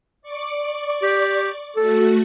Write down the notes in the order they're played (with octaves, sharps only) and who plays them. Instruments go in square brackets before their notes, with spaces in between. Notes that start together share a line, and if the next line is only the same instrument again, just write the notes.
[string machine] D5 C#6 D6
[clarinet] G4
[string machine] A3 F#4 [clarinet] A4